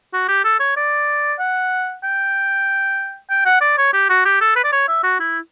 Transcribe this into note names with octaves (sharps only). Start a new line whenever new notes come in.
F#4
G4
A4
C#5
D5
F#5
G5
G5
F#5
D5
C#5
G4
F#4
G4
A4
B4
D5
C#5
E5
F#4
E4